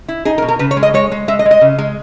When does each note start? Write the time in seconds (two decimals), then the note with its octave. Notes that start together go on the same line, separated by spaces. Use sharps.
0.08 E4
0.25 D#4 G#4
0.38 A#4
0.42 B2
0.48 A#4
0.59 C#3 B4
0.71 C#5
0.77 G#3
0.83 D#5
0.94 G#3 C#5
1.12 G#3
1.28 G#3 E5
1.39 D#5
1.45 G#3
1.51 D#5
1.61 C#3
1.78 G#3